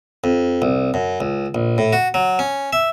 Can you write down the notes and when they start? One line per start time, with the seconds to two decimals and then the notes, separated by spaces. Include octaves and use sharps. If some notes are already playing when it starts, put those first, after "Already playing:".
0.24 F2
0.62 C2
0.94 F#2
1.20 C#2
1.55 A#1
1.78 A2
1.93 F#4
2.14 F#3
2.39 C#4
2.73 E5